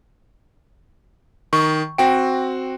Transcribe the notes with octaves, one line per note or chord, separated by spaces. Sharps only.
D#3 C#6
C4 F#4 G5 D7